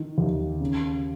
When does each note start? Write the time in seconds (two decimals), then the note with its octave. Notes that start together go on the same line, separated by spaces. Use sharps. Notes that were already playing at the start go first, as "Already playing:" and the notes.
Already playing: D#3
0.18 D#2
0.60 C#3